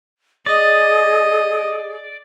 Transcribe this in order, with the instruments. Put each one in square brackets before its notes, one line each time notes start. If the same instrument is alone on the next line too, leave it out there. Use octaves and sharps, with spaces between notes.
[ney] G#4 [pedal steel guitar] D5 [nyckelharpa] D#5